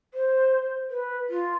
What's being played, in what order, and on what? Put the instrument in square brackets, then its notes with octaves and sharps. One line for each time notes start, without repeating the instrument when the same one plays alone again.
[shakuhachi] C5
B4
F4